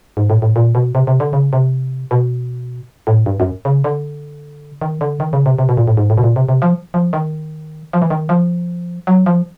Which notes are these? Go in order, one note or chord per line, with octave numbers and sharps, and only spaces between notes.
G#2
A2
A2
A#2
B2
C3
C3
D3
C#3
C3
B2
A2
G2
F#2
C#3
D3
D#3
D3
D#3
C#3
C3
C3
B2
A#2
A2
G#2
A2
B2
A#2
C3
C3
F3
F3
D#3
F3
E3
D#3
F3
F#3
F3